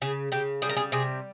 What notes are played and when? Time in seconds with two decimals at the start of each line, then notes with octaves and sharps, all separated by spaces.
0.02 C#3 G#4
0.32 C#3 G4
0.62 G3 G#4
0.69 A#4
0.77 G#4
0.92 C3 G#4